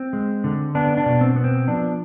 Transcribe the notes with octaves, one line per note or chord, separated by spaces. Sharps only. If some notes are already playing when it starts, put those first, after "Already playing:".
Already playing: C4
G#3
D3
B3 D4
D4
B2
C4
B3
C4
F3 D4